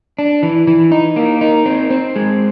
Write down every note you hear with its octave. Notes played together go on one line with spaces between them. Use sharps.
D4
E3
E3
D#4
A#3
D#4
C4
C4
G#3